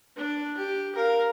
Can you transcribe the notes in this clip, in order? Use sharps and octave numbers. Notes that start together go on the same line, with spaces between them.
D4
G4
A#4 F5